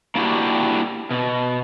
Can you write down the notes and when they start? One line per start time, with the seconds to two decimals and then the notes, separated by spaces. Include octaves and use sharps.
0.15 A#3 D4 E4 F#4 G4
1.11 B2